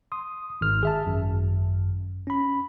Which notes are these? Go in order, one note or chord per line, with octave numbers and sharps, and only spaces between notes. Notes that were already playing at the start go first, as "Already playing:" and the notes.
C6 D#6
G#1 F6
G#4 E5 A5
G#1 F#2
C#4 B5